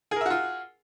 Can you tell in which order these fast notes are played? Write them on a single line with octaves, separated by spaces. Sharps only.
G#4 A#4 E5 F#4 F4